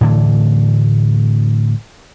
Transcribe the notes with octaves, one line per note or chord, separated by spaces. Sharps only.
A2 D3 E3 A3